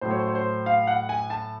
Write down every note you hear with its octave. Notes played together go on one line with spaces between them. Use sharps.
A2 F#3 A3 C5
C#5
C5
C#5
C5
F5
F#5
G#5
A5